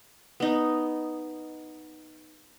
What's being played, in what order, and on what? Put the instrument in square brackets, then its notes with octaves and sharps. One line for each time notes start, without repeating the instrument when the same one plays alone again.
[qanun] B3 D#4